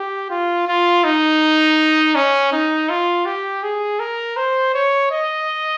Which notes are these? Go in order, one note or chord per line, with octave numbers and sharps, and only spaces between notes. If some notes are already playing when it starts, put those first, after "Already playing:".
Already playing: G4
F4
F4
D#4
C#4
D#4
F4
G4
G#4
A#4
C5
C#5
D#5